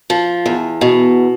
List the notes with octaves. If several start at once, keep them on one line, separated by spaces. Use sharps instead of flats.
F3
E2
B2